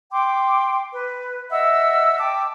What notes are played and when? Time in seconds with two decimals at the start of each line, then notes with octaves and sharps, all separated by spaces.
0.11 G5 C6 D6
0.92 B4
1.51 D#5 E5 F#5 E6
2.20 G5 A5 D6